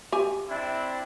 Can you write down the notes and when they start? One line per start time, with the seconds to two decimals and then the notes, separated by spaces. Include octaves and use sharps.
0.12 G4 G#5
0.49 C4 D4 E4